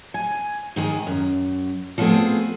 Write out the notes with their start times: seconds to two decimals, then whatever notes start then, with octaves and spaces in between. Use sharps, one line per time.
0.14 G#5
0.76 G#2 D#3 G#4
1.07 F#2
1.98 F3 G3 A3 B3 C4 G#4